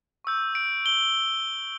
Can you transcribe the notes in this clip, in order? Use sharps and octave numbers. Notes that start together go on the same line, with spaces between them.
C#6 E6 G6
D7
G7